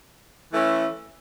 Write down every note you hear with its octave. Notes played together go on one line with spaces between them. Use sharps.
E3 A3 C#4 E4